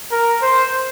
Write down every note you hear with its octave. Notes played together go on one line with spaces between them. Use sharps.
A#4
C5